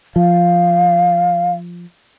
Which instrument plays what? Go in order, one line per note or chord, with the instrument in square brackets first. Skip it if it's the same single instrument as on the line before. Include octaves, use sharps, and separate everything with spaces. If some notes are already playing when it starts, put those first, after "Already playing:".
[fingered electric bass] F3 [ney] F5